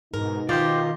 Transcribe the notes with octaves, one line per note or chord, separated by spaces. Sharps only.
G#2 B2 D#4 A#4
D#3 F4 G4 C5 D5 D#5